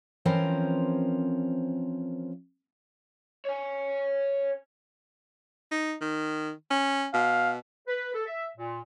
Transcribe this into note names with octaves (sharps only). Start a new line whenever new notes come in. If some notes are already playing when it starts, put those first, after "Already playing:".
E3 F3 C4 C#4 A#4 C5
C#5 G#5
D#4
D#3
C#4
B2 F5
B4
A4
E5
A#2